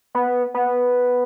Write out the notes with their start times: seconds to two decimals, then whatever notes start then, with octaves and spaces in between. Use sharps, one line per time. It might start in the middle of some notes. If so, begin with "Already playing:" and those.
0.15 B3
0.54 B3